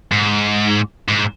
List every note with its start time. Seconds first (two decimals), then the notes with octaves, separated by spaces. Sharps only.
0.12 G#2
1.09 G#2